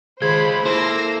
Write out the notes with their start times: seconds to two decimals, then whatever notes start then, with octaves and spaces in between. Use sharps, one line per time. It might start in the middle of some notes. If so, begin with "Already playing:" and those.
0.22 D#3 G#3 F4 G#4 C5 B5 G#6
0.65 A#3 E4 A4 C5 E6 A#6 C7